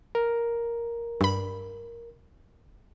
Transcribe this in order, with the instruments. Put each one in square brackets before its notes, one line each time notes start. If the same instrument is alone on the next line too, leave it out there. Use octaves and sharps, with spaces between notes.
[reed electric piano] A#4
[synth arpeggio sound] G2 B5